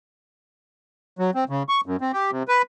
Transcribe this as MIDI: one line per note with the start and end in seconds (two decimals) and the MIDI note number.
1.19 1.31 54
1.35 1.44 60
1.49 1.63 49
1.69 1.81 85
1.86 1.97 42
2.01 2.12 60
2.13 2.31 67
2.31 2.43 48
2.48 2.62 71